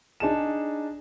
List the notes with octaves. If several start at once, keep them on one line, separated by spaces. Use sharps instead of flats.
D4 D#4 G#4 A5 E7